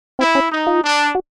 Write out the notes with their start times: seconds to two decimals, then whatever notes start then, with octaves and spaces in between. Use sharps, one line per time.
0.19 C4 E4
0.35 C#4
0.51 D#4
0.67 F4
0.83 D4
1.15 F#4